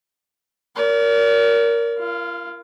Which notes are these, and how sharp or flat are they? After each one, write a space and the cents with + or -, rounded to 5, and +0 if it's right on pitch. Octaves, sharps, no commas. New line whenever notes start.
A#4 +0 D5 -45
F4 -40 F5 +0